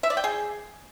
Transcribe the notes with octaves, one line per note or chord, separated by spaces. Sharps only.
E5
D5
G5
G#4